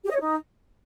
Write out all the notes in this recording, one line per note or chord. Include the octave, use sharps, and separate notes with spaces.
G4
D#5
C#5
D#4